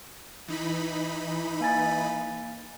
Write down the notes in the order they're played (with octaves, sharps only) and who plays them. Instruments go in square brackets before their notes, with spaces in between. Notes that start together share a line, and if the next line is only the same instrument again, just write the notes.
[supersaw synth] E3 D#4 B5
[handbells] A#3 G#5 A6